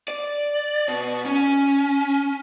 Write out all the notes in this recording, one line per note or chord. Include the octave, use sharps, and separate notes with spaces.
D5
B2
C#4